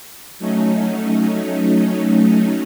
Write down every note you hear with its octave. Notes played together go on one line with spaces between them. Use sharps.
F#3 A3 C#4 D#4